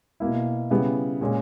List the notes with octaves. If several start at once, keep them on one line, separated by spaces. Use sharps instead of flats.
B2 A#3 E4
C#3 G3 B3 E4 G#4
A#2 G#3 C#4